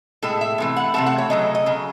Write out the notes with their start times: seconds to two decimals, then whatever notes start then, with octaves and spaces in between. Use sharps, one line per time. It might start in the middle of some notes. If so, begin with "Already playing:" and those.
0.22 A2 G#3 A4
0.41 E5
0.58 C3 E3 A3
0.77 F#5
0.94 C3 E3 A3 E5
1.06 F#5
1.18 C#5
1.30 C#3 F#3 A3 D#5
1.55 D#5
1.66 C#3 F#3